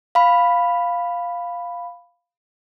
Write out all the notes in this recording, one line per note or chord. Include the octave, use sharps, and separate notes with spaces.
F5 B5